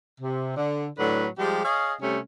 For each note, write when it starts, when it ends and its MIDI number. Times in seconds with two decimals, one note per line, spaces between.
0.20 0.56 48
0.57 0.87 50
0.99 1.26 45
0.99 1.26 50
0.99 1.26 54
0.99 1.26 71
1.39 1.61 53
1.39 1.61 55
1.39 1.61 56
1.39 1.61 67
1.64 1.93 68
1.64 1.93 73
1.64 1.93 75
1.64 1.93 77
2.02 2.18 48
2.02 2.18 55
2.02 2.18 57
2.02 2.18 61